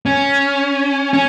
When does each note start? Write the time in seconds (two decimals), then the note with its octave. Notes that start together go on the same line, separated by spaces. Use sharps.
0.06 C#4
1.13 C#4